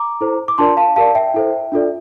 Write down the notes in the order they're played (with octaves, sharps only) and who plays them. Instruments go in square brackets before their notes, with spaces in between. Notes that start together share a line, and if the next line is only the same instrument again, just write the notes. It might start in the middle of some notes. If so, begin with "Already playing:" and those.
Already playing: [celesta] A#5 D6
E4 A4 C5
D6
D4 F4 A#4 D5 A5 C6
F5 A5
G4 A#4 D5 F5 A5
E5 G5
E4 A4 C5
D4 F4 A4 D5